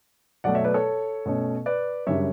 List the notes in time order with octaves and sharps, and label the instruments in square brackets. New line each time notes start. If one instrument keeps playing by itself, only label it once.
[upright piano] B2 F#3 A3 D5 F#5
C#5 E5
B4 D5
A4 C#5
B2 A3 C#4
B4 D5
F#2 C#3 G3 D4 C#5 E5